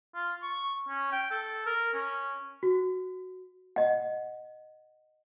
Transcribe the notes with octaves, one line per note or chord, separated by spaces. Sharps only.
F4
C#6
C#4
G5
A4
A#4
C#4
F#4
D#5 F#5